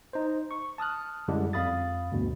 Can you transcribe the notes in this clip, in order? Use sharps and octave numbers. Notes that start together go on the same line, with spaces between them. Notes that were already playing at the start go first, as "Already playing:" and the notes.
D#4 C5
C#6
A5 D#6 F6 F#6
F#2 D3 G3 G#3 D4 E4
F2 F5 B5 D#6 A6
D2 G2 B2